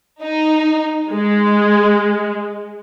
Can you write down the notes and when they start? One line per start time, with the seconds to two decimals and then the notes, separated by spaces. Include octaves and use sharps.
0.21 D#4
1.11 G#3